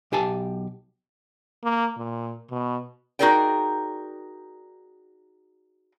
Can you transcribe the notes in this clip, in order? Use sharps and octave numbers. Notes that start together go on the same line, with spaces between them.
B1 G4 G#5 A5
A#3
A#2
B2
D#4 F#4 G#4 A#4 D5 G5